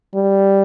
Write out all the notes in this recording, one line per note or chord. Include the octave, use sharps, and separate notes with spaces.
G3